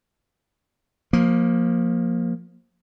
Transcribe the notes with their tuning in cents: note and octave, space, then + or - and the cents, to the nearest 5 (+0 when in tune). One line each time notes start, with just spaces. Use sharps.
F3 +20 A#3 +0